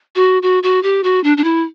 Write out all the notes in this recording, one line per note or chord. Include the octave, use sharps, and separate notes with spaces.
F#4
F#4
F#4
G4
F#4
D4
D4
E4